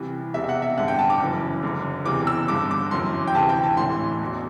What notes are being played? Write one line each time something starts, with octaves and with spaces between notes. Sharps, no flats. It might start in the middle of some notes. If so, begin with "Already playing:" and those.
Already playing: C2 C3 E3
E1 E2 C3 E5
E5
F#5
E5
A1 G2 D3 F#5
G5
A5
D6
F#1 F#2 E3
F#1 F#2 D3
F#1 E2 C3 E3 D6
E6
G1 G2 D3 D6
D6
G1 F#2 E3 C6
G5
D2 C3 E3 A5
G5
A5
A1 A2 E3 C6
E1 E2 B2